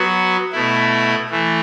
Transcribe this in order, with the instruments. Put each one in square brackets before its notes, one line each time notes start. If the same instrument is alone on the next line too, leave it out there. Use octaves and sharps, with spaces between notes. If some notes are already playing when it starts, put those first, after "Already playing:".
Already playing: [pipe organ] F#3 B3 F#4
B2 A3 E4
E3 A3